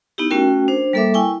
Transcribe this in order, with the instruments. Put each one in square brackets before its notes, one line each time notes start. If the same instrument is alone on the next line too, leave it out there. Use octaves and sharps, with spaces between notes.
[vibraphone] B3 D#4 E4 G4
A3 C#4 F#4 A#4 G5
D4 C5
G3 A#3 A4 A#4 E5 D6
E4 G5 G#5 C#6